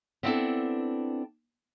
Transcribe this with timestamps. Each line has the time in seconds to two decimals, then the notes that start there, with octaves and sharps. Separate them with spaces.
0.23 B3 C4 D4 E4 F4 A4